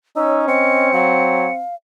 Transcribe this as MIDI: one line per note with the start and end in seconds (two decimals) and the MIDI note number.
0.16 0.90 61
0.16 0.44 63
0.16 0.44 73
0.16 0.40 88
0.48 1.62 60
0.48 0.89 75
0.48 1.53 97
0.93 1.49 54
0.93 1.75 77